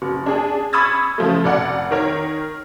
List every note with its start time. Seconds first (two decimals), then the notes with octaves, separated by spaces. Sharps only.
0.02 F#1
0.26 D4 G#4
0.73 B5 C#6 D#6 E6 G#6 A6
1.18 C#3 F3 A3
1.44 F1 D5 F#5
1.91 D#3 A#4 C#5